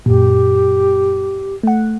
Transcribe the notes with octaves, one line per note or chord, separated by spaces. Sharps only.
F#2 A#2 G4
A3 F#5